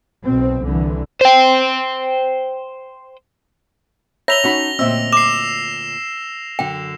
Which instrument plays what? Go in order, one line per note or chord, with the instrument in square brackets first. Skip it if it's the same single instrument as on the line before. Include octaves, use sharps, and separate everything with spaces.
[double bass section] B1 B2 C4
C2 D3 E3
[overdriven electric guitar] C5 G5
[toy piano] C#5 [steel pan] E5 A#5 B5 [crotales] A#6 F7 G7
[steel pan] C#4 F#4 B5 [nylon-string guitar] D#4 A5
[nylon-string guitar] D2 A#2 D#5 [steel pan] C4 E5 [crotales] E6
[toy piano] D6 [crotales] C7 E7
[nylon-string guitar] F#2 D3 [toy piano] G5